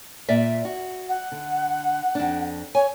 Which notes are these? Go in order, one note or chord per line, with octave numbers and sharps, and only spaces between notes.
A#2 D5 E5
F#4
F#5
D3
F2 D4
C#5 G#5